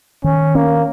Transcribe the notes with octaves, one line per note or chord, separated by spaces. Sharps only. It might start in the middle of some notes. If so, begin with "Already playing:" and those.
D#3 C#4
A#3 C#4